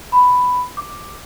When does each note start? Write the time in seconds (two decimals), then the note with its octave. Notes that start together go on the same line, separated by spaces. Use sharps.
0.12 B5
0.77 D6